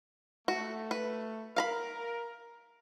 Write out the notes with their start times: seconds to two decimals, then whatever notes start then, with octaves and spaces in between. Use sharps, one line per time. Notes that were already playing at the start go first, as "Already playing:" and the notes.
0.48 A3 F#4
0.91 B4
1.56 A#4 F5 A#5 B5